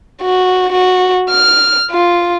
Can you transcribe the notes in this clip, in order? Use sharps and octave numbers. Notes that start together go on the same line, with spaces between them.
F#4
F#4
F6
F4